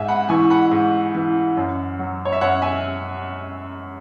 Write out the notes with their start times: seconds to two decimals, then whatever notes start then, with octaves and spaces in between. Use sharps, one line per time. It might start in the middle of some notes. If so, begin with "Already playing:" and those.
Already playing: G#2 E5 G#5
0.08 F#5 B5
0.29 E3 G#5 C#6
0.50 F#5 B5
0.71 G#2
1.15 E3
1.57 F#2
1.99 F#3
2.25 C#5
2.32 E5
2.41 F#2 C#5 F#5
2.62 E5 G#5